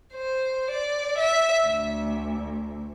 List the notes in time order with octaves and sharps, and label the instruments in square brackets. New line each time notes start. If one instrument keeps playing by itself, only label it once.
[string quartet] C5
D5
E5
D2